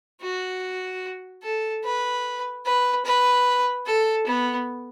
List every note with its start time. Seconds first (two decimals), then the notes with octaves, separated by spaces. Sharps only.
0.22 F#4
1.43 A4
1.84 B4
2.66 B4
3.05 B4
3.86 A4
4.27 B3